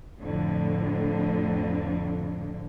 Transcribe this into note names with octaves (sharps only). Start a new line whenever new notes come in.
F2 A2 D3